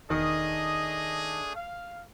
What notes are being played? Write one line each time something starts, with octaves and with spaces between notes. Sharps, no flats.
E1 D#3 A3 D4 G#4 D#5
F5